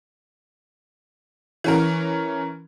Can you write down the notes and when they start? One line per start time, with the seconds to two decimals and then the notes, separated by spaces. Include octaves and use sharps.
1.64 E3 C#4 A#4